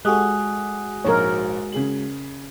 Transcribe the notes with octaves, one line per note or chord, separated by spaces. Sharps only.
G#3 F#4 G4 A4 G#5 D#6 F#6
A#1 G#2 A#4 C#5
C#3 G#4 F#7